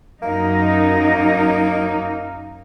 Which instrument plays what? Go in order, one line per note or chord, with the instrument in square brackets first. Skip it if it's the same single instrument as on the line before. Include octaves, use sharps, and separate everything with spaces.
[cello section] F#2 D#4 [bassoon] A#3